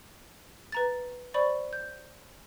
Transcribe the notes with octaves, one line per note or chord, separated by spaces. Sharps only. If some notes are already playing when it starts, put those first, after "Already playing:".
B4 A#5 A6
C5 D5 B5 C#6
G6